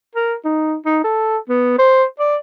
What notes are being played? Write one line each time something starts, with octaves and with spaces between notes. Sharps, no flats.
A#4
D#4
D#4
A4
B3
C5
D5